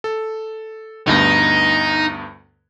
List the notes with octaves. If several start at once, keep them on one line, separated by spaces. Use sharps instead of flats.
A4
D2 G2 B3 D#4